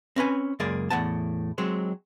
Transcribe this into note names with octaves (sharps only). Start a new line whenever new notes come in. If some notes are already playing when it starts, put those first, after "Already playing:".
C4 C#4 B4 G#5
C#2 F#2 A#3 G#4 D5
E2 A2 F#5 A5
F#3 G#3 C4